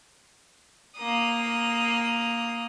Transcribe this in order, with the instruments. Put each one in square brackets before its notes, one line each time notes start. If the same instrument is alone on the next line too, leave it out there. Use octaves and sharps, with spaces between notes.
[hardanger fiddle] A#3 D#6